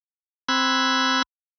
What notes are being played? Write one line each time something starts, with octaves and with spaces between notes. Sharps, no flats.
C4 B5 E6 F#6 G#6